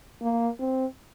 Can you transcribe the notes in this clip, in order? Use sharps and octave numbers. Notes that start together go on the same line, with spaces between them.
A#3
C4